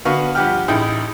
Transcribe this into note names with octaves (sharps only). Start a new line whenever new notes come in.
D3 B3 F#4 F5 C#6
G2 F3 G4 F#5 G5 F6
A1 D#4 E4 G#4 G5 D#6